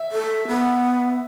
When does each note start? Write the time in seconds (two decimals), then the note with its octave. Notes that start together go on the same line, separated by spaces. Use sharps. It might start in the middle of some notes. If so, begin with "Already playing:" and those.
Already playing: E5
0.12 A4
0.48 B3